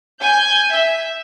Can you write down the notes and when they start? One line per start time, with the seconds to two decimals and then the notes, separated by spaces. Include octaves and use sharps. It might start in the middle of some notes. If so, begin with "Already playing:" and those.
0.22 G#5 G6
0.72 E5